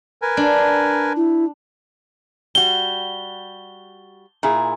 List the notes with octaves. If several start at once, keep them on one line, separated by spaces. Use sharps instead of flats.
A#4 B4 G#5
D4
E4
G3 F#4 G7
A#2 E4 G#4